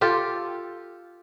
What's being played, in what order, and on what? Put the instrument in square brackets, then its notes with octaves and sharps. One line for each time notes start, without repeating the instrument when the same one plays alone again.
[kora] F4 G4 A4